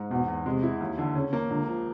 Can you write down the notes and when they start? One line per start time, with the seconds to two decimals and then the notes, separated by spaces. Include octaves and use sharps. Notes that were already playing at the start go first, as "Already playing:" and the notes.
Already playing: G#2
0.11 E2 B2
0.28 E2
0.46 C3 G#3
0.63 E4
0.81 D#2
0.98 D3
1.15 C#3 C#4
1.33 A#3
1.50 C#2 D3
1.68 F3